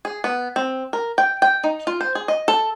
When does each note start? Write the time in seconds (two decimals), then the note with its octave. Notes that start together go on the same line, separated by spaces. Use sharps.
0.05 G#4
0.24 B3
0.56 C4
0.93 A#4
1.18 G5
1.42 G5
1.64 D#4
1.87 F4
2.01 C5
2.15 G#4
2.28 D#5
2.48 A4